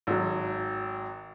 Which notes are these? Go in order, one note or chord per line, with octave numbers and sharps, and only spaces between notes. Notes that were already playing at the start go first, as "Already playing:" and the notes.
G#1 F#3